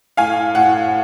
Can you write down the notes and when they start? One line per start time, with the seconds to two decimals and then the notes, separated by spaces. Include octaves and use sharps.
0.17 A2 F5 G#5
0.55 A2 F#5